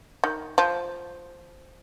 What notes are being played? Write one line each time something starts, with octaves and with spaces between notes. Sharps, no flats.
D#3
F3